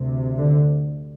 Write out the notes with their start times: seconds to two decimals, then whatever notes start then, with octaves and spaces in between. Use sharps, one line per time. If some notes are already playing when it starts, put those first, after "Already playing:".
Already playing: D2 C3
0.38 D3